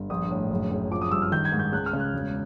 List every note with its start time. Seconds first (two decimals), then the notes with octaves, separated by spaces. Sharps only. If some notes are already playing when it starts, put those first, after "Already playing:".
Already playing: G1
0.10 A#1 D#6
0.31 A2
0.50 F#1
0.70 F#1
0.91 F3 D6
1.01 D#6
1.11 G2 E6
1.22 F6
1.32 D#3 G6
1.45 G#6
1.52 G#2
1.59 G6
1.73 C#2 F#6
1.86 F6
1.93 C#3
2.00 F#6
2.14 E1